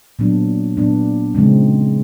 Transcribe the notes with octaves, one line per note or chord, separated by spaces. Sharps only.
A#2 F#3 B3 D4
A#2 F#3 B3 D4
C#3 F3 G#3 C4